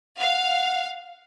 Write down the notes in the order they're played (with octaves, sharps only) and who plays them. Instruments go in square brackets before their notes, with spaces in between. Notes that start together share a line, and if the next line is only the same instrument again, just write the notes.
[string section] F5 [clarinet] F#5